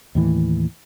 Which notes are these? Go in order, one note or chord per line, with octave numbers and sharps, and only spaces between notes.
D#2 A2 E3